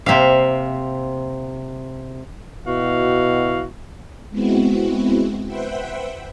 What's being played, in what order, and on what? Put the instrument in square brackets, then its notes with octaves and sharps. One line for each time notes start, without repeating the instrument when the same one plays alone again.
[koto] C3 E5 F5 [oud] A#3 C4
[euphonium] B2 [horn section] E4 F#4 F5
[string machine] G#3 B3 C4 E4 F#4
B4 C5 E5 F#5 G5